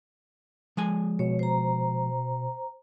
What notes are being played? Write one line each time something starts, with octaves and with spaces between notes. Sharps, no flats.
F3 G#3 G#5
B2 C#5
C5 A#5